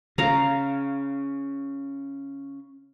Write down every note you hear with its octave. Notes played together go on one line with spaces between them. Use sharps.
C#3 F5 A#5